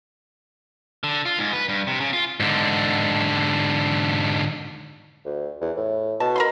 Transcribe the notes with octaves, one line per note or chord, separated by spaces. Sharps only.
D3
F4
G#2
B4
G2
C3
C#3
F4
G#2 D3
D2
E2
A2
B2 A5
A#4 B5 C6